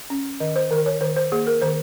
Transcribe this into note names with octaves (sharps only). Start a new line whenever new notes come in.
C#4
D#3 D#5
C5
D#3 A#4
C#5
D#3 C5
C5
A#3 G#4
A#4
D#3 C5